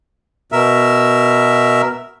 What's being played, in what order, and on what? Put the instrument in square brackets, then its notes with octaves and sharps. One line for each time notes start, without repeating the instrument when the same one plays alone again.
[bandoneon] B2 A#4 E5